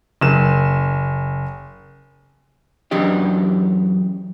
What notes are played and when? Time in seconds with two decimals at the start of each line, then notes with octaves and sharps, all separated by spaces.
0.21 F#1 E7
2.91 F#2 E3 D4 G4 D#5